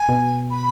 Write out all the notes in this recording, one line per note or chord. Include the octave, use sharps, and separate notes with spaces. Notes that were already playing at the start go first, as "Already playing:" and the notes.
Already playing: G#5
B2
B5